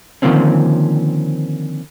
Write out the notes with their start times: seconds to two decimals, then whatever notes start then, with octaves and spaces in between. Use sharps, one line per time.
0.22 D3 D#3 F3 A#3 C4 C#4